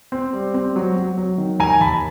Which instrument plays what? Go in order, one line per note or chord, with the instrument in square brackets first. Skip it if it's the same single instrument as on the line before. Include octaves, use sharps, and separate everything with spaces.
[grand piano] C4
G3
C4
F#3
F#3
F#3
D#3
D#2 G#5 A#5
D#2 A5 B5